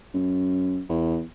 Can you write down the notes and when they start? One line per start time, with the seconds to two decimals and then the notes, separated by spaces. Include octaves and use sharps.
0.14 F#2
0.89 E2